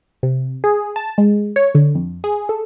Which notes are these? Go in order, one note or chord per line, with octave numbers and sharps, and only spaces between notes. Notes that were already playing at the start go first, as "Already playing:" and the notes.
C3
G#4
A5
G#3
C#5
D3
F2
G#4
A4